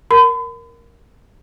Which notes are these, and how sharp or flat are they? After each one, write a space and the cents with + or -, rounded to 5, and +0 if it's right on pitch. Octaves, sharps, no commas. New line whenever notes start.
A#4 +0 B5 +40